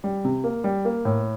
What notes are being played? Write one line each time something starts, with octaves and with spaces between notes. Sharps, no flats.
G3
C3
A#3
G3
A#3
A2